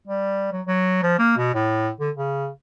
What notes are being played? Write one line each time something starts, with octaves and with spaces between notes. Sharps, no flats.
G3
F#3
F#3
F3
A#3
B2
A2
D3
C#3